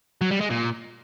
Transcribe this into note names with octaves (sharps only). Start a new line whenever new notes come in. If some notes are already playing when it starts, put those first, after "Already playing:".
F#3
G3
G#3
A#2